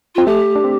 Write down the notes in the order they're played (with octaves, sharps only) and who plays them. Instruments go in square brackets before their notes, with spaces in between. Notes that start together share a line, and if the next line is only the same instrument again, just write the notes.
[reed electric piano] C4 [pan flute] F4
[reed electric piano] A3 [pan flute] G4
[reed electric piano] D4
C4